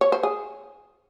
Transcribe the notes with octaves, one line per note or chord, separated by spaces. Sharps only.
C#5
C5
G#4